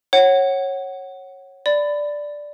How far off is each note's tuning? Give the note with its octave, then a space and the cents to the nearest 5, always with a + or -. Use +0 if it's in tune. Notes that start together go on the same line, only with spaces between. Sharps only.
C#5 -20 F#5 +15
D5 +0 B5 +20